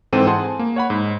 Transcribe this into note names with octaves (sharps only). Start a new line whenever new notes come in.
G#2 E3 C4 A4 G5 D#7
G#4 C5 F#5 A5 C6
G#5
A#3
C#5 F#5 B5
G#2